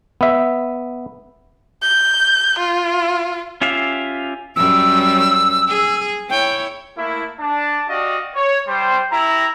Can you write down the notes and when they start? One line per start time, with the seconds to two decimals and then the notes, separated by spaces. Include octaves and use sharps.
0.21 B3 E5
1.82 G6
2.58 F4
3.61 C#4 F4 G4 E5 F5
4.56 F#2 G3 C#4 E6
5.69 G#4
6.30 E4 C#5 G5
6.97 A3 A#3 E4
7.40 D4 A5
7.89 F#4 G4 D5 D#5 F5
8.35 C#5
8.68 G3 C5
9.12 E4 G4 A#5